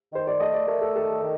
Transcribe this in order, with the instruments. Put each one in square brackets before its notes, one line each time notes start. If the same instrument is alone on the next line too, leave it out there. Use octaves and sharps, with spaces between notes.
[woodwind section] D#3 [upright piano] C5
[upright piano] D5
[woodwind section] A3 [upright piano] D#5
[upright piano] D5
[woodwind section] A3 [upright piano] A#4
[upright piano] A4
[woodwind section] D#3 [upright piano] A4
[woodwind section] D#3